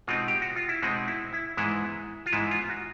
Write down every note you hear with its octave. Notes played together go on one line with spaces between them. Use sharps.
B2 G#3 C4 D#4 F4
G4
F#4
F4
E4
B2 G#3 C4 D#4
E4
E4
G#2 E3 G#3 B3 E4
F4
G#2 E3 G#3 B3 E4
F4
F#4